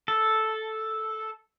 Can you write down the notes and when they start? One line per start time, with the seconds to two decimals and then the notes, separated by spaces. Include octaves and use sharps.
0.08 A4